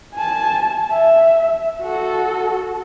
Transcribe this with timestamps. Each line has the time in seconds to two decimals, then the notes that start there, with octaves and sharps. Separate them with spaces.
0.14 G#5 A5
0.90 E5
1.82 F#4 A4